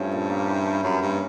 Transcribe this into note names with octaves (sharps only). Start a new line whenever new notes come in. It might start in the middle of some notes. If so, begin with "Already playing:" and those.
Already playing: G2 F3 A3 C#4
A#2
A#3
E3
G3
F#2 C#4
G2 A#3